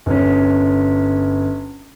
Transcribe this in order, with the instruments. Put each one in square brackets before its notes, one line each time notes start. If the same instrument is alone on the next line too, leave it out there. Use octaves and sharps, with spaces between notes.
[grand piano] G1 C#4